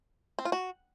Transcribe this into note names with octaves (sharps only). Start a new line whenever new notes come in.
C4
F4
F#4